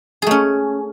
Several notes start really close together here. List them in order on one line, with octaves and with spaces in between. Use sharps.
G#4 A3 C#4